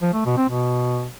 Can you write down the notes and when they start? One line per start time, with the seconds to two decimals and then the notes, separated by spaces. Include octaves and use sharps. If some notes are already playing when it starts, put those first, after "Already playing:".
0.02 F3
0.14 A3
0.26 B2
0.37 C4
0.49 B2